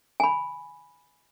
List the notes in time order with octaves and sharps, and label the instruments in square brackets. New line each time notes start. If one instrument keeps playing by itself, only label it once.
[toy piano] G#5 B5